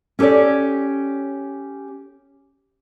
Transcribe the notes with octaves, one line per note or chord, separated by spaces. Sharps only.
C#4 G4 A4 C#5 D5